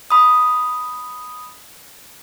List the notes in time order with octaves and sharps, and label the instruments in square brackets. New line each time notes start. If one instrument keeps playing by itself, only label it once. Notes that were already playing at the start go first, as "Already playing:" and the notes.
[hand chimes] B5 D#6